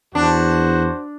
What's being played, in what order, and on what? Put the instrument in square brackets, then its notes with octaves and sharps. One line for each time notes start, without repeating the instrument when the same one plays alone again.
[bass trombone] E2 [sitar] D4 [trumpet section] F#4 C5